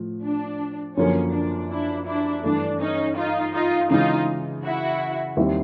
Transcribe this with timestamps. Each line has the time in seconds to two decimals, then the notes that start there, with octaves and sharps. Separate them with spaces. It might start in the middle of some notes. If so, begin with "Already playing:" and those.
Already playing: A2 F3
0.24 D4
0.96 F#2 D3 F3 A#3 C#4
1.33 D4
1.70 D4 E4
2.06 D4 E4
2.44 G2 E3 A3 D4
2.80 C#4 D#4
3.16 D#4 F4
3.54 D#4 F4
3.90 C#3 E3 G#3 D#4 F4
4.64 E4 F#4
5.37 D#2 D#3 G3 C4 E4